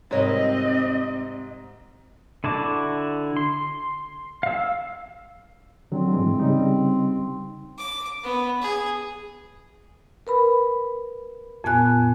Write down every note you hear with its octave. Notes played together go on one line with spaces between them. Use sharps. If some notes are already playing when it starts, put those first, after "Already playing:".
G#2 C3 G3 C4 A#4 C#5 D#5
D3 E4 F#4 A5 D6
C6
F5 E6
D3 F#3 C4
G#2 E3 G#3
C#3 G3 D#4
D6
B3
G#4
A#4 B4 B5
F2 A#2 B3 G#5 F#6